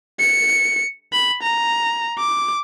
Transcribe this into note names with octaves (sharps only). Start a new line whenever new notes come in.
C#7
B5
A#5
D6